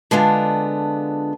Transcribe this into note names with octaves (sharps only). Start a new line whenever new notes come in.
D3 G#3 B3 D4 F4